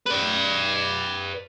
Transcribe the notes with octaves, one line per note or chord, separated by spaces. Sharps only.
B4 D5